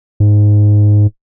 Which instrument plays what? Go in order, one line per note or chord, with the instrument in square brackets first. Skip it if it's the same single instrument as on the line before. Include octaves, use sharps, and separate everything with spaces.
[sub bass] G#2